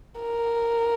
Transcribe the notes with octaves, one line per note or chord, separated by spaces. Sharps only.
A#4